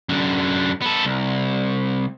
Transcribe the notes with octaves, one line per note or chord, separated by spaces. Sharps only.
F#2 D3
B3 A4
C2